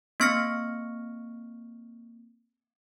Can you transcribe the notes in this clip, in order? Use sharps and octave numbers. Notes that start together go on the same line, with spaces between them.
A#3 C4 C#6 F6 A#6 C#7